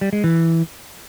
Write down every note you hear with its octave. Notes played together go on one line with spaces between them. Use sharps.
G3
G#3
E3